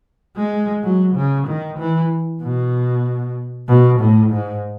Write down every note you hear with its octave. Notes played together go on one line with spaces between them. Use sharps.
G#3
F#3
C#3
D#3
E3
B2
B2
A2
G#2